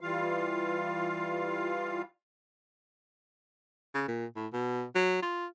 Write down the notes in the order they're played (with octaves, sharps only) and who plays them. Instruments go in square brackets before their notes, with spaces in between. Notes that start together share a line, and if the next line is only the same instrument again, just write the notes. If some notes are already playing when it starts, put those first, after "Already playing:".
[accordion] E3 G3 F4 F5
[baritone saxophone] C#3
A#2
A2
B2
F#3
F4